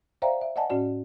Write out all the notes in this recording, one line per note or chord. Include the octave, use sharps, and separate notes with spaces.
C5 D5 E5 F5 G5 A#5
E5
D5 D#5 F#5 G#5 A5
A2 C#4 F#4 D5